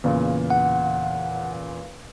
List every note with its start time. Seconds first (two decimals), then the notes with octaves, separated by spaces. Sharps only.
0.04 E2 A#2 C#3
0.50 F#5